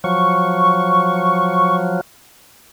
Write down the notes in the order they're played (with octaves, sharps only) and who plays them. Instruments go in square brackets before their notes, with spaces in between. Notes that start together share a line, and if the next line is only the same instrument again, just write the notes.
[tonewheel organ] F3 F#3 [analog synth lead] C#6